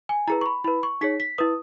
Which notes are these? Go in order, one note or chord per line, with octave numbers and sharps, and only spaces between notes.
G#5
E4 G#4 B4 A#5
C#6
B5
E4 B4 B5
C#6
D#4 G#4 C#5 B6
B6
E4 B4 D#6